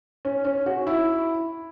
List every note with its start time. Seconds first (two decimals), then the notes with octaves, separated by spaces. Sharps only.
0.25 C#4
0.45 C#4
0.66 F#4
0.87 E4